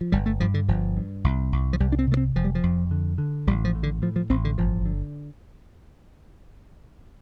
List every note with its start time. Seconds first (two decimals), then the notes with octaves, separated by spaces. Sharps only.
0.01 F3
0.12 G1 G3
0.26 A3
0.40 G2 F3
0.54 D3
0.68 G1 F3
0.97 G2
1.24 C2
1.52 C2
1.73 F3
1.80 C2 G3
1.92 D4
1.99 C4
2.07 C3 A3
2.17 C4
2.35 F1 F3
2.44 G3
2.55 F3
2.63 F2
2.91 D3
3.18 D3
3.47 A1 G3
3.65 F3
3.75 A2
3.83 D3
4.02 A2 F3
4.16 F3
4.30 A1 C4
4.45 D3
4.58 G1 F3
4.86 D3